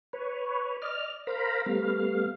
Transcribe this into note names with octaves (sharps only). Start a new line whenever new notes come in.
B4 C#5
D5 D#5 F6
A#4 C5 F5 A#5 B5
G3 A3 B3 F5